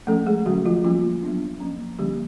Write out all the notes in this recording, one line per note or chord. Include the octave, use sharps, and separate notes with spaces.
F3 A3 C#4 A4
G#3 G#4
D3 F#3 A3 C#4 F#4
F3 F4
F3 G3 A#3 C#4 F4
F#3 B3 D4
F3 A#3 C#4
D3 F3 G3 A#3 C#4 G4